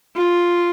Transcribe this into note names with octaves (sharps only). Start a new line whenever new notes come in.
F4